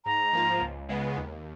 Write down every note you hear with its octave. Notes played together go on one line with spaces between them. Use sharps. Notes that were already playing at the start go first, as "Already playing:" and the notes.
G#2 A#5
F3 A#3 F4
C#2
C#3 G#3 B3
D#2